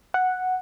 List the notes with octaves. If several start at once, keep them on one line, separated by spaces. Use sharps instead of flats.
F#5